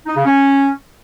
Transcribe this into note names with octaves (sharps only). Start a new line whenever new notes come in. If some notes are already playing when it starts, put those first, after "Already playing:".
D#4
C#3
C#4